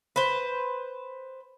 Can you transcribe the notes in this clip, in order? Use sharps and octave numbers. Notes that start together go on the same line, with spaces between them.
B4 C5